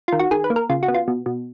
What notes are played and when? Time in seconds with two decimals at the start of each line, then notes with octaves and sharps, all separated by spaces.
0.08 D#3 F4
0.19 F#4
0.31 D#3 G#4
0.44 B4
0.50 A#3
0.56 A#4
0.69 C#3 F4
0.83 F#4
0.88 B3
0.94 F4
1.08 B2
1.26 B2